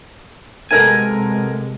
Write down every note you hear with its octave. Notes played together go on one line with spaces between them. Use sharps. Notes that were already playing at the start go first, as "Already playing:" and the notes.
C3 G#3 B3 A4 A#4 G#5